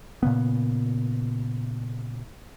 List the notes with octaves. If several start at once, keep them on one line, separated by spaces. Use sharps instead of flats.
A#2 C#3 B3